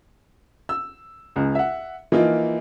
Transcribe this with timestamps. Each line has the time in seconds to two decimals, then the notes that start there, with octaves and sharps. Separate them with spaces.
0.69 E6
1.36 C#2 C#3
1.55 E5 F#5
2.12 E3 F3 A#3 D#4 F4